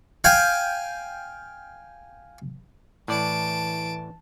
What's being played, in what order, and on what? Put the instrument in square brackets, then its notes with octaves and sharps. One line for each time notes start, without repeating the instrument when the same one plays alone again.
[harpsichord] F5 G5 G#5
[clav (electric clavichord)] A2 D5 [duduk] E3 [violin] A5 D7